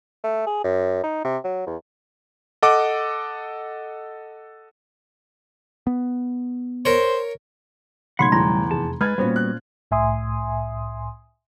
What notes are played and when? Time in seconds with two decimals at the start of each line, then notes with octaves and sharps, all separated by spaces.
0.24 A3
0.47 G#4
0.64 F#2
1.04 D#4
1.25 C3
1.44 F#3
1.66 E2
2.62 A4 D#5 F#5 D6
5.87 B3
6.85 A#4 C5 C#5
8.19 B1 C#3 A3 F#5 B5 C6 G#6
8.32 E2 G3 A#5
8.71 F1 G#4 A5
9.01 G#3 B4 F6 G#6 A6
9.18 A#2 G3 B3 C#4 F#4 C5
9.36 F#6
9.91 C2 A2 E5 G#5 C6 D#6